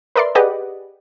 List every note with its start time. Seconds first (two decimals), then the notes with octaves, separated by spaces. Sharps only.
0.16 A#4 B4 D5 E5 C6
0.35 G4 G#4 B4 D5 D#5 F#5